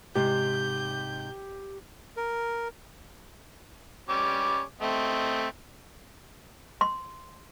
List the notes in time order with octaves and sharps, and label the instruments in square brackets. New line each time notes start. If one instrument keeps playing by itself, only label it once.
[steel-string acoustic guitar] G#2 C3 [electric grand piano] G4 [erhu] G6
[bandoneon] A#4
[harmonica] G3 C#4 D6
A3 C4 D#5
[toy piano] C6